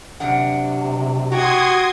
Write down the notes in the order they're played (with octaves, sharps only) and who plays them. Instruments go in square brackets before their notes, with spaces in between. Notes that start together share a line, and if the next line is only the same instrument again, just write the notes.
[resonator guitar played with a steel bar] F#2 D4 F#5 [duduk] C3
[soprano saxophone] F#4 [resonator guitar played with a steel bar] G4 [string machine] C6 D#6 G#6